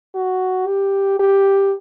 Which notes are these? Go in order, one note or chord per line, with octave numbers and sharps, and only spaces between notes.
F#4
G4
G4